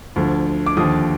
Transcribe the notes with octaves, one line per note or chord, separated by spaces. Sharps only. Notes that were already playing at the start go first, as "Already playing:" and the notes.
D2 D3 F3
D6
D#2 D3 F3 D#6